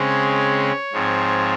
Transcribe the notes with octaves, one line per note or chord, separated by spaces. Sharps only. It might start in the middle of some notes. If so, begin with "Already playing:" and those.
Already playing: C#3 G#3 C4 C#5
G#2 F3 C4